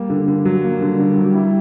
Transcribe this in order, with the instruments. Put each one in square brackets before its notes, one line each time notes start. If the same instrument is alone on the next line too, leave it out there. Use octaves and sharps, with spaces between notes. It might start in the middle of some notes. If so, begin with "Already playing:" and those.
Already playing: [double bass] G3 [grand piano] A#3
[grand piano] D3
D3
F#3
[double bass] G3 [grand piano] A#3
[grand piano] D3
D3
F#3
E4